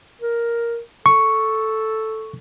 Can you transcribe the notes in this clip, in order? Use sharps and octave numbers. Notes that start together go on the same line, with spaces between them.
A#4
A4 C#6